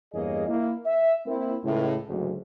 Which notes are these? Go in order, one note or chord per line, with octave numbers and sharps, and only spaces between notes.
E2 G2 A#3 G#4 C#5 D#5
A#3 E4
E5
A#3 C4 E4
C#2 A2
F#1 D2 G#2